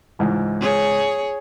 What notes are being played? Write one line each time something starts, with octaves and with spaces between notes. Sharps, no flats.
C#2 G#2 E3
G#4 C#5